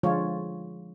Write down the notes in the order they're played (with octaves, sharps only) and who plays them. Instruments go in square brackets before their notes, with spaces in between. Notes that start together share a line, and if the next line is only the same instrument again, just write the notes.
[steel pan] D3 F3 G#3 F4 C#5